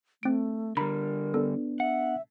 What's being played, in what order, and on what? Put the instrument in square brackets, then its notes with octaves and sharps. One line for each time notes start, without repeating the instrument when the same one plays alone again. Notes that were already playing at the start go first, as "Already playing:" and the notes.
[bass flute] A3 [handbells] C4 D7
[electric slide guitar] D3 G3 [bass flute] A#4 [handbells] A#5 B5
[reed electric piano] B3 D4 [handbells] A4
[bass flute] E5 [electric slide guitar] F#5